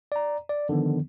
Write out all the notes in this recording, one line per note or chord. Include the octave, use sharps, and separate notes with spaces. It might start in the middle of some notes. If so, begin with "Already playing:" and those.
D5 A#5
D5
D3 D#3 F3 B3